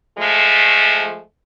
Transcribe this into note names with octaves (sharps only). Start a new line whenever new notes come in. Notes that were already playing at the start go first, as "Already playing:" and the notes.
F3 G#3 A3